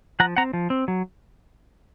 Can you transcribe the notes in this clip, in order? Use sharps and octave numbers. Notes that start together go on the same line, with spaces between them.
F3 F#5 A#5
C4 F#5 A#5
F3
C4
F#3